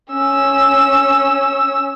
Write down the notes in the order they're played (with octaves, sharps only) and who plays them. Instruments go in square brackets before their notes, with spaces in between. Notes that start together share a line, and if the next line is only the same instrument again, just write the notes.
[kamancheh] C#4 E6